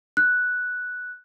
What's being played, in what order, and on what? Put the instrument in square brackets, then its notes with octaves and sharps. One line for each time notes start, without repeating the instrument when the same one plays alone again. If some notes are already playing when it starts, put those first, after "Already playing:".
[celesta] F#6